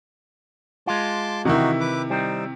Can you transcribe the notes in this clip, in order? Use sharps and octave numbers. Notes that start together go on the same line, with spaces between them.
G#3 F4 A5 C6 D6
C3 D#3 E3 D#4 E4 F#4
B4 D6
G3 C4 D#4